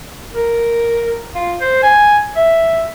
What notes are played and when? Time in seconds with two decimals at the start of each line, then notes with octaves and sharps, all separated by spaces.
0.34 A#4
1.35 F4
1.60 C5
1.83 G#5
2.36 E5